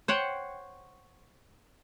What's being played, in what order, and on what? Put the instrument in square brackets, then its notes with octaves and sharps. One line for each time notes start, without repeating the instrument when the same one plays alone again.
[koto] C5 C#5 F#5 G5